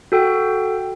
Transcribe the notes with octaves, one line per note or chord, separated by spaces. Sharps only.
F#4 A4 G5